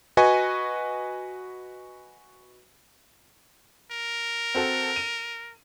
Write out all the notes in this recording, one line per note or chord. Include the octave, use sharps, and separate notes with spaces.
F#4 B4 D#5 G#5 C#6
A#4
C4 F#4 A4
D#7